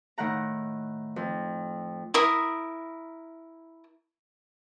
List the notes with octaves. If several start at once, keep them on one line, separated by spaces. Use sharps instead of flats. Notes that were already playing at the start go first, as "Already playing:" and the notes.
A2 D#3 F#5 A#5
F2
E4 A#4 D#6